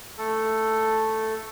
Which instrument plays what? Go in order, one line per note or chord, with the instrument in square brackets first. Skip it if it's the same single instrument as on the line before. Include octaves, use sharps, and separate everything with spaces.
[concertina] A3 A4